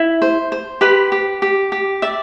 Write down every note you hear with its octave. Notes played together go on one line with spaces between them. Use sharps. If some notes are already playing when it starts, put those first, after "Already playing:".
Already playing: E4
C5
C5
G4 B4 B5
G4
G4
G4
D5 E5